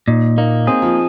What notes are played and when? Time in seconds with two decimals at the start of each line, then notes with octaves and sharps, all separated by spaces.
0.07 A#2 D#4
0.37 A#3 D#4
0.67 C4 G#4
0.82 F3